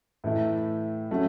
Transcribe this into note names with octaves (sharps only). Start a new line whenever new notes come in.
A2 E3 A3 E4
F#3 A3 C#4